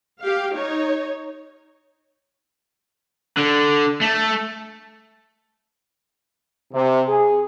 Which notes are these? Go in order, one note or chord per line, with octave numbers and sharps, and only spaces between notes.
G4 F5
D#4 C#5
D3
A3
C3
G#4